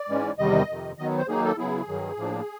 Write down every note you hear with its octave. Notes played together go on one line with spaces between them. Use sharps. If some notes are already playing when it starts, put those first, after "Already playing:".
Already playing: D5
G#2 E3 G#3 C#4
E2 C3 D#3 G3 D#5
F2 C3 D#3
D#3 F#3 B3 D#5
C5
D#3 F#3 A#3 D#4 G#4
A4
C#3 F#3 B3 E4 G#4
G2 D#3 F#3
A2 F3 A#3 D4